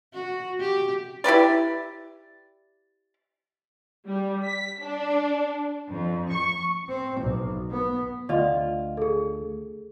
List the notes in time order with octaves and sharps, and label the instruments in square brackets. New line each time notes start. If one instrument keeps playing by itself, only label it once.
[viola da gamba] F#4
G4
[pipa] E4 G4 B4 D5
[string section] G3
B6
D4
F2
C#6
[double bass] C4
B1
B3
[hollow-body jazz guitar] D2 F4 [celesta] D5 D#5
[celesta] G#4 A4